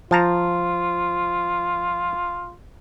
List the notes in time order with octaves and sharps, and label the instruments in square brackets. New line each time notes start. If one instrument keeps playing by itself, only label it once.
[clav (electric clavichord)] F3 A5 A#5 [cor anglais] F4